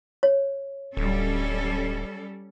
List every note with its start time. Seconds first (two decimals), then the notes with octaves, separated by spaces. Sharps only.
0.23 C#5
0.97 D1 G3 C#4 A4